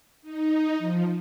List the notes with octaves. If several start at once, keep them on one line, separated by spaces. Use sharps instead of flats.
D#4
F3